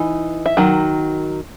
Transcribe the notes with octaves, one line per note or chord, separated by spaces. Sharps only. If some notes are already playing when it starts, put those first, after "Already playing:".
Already playing: E3 D#4
E5
D#3 F#3